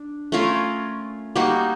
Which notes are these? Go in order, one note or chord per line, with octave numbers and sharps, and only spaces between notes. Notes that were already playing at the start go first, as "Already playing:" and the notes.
Already playing: D4
A3 C#4 F4 A#4
G3 A#3 D#4 F#4